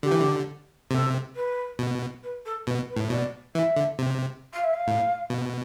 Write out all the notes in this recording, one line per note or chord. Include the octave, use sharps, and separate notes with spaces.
D3 G4
E3
D3
C3 A4
B4
B2
B4
A4
B2 B4
B4
A2
B2 D5
E3 E5
D3
C3
F5
E5
F5
A2
B2